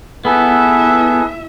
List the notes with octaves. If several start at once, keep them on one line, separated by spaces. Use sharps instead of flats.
B3 E4 G#4 A4 B4 E5